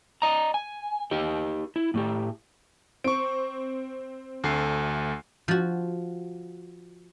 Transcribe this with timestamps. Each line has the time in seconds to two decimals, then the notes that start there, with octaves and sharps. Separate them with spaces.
0.22 D5 D#5 A#5
0.54 G#5
1.11 D#4 G4 D#5
1.76 E4
1.94 A2 A3 G4
3.04 C4 C#6 D7
4.44 D2 A3 C7
5.48 F3 F#4